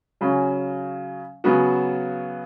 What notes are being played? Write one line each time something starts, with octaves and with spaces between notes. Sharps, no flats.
C#3 F#3 C#4
C#3 F#3 B3 F#4